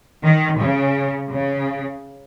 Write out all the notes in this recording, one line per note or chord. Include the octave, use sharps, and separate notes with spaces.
D#3
C#3
C#3